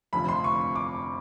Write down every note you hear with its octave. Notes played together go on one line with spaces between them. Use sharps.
F1 F2 D3 F3 B5
C6
C#6
D6